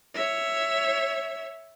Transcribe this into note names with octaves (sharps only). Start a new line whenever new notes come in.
C#5 E5